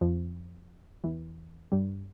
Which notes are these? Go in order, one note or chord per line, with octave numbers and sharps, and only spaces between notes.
F2 F3
E2 E3
G2 G3